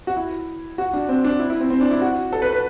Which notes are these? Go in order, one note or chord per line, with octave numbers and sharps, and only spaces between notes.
F#4
E4
F#4
D4
C4
D4
E4
E4
C4
C4
D4
E4
F#4
A4
B4
B4